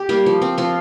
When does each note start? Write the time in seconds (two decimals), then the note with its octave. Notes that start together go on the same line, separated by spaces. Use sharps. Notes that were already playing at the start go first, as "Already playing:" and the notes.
Already playing: G4
0.09 G3 A#3
0.26 F3
0.42 C4
0.58 F3 F4